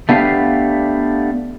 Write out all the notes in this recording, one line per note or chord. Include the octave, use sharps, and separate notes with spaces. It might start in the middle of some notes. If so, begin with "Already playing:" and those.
A3 B3 D4 G4 F5